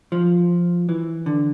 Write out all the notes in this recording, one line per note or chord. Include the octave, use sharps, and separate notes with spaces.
F3
E3
D3